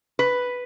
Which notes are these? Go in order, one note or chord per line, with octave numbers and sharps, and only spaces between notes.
B4